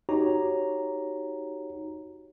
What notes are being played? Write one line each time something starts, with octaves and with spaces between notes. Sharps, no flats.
D#4 F#4 G4 C#5 A#5